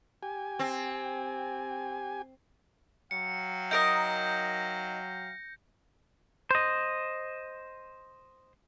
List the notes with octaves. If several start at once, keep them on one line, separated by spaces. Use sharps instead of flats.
G4 G#5
C4
F#3 F5 G5 C#7
D#4 A#4 D#5 G6 A#6
C5 D#5